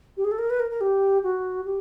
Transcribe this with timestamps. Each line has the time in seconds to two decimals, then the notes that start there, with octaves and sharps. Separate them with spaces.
0.17 G4
0.24 G#4
0.31 A4
0.38 A#4
0.50 B4
0.59 A#4
0.70 A#4
0.80 G4
1.23 F#4
1.64 G4